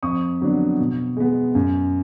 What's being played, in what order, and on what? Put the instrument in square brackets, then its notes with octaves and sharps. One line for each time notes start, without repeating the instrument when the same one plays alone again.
[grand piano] F2 C#6 D#6
D3 F#3 B3 D4
B2
G#3 B3
F#2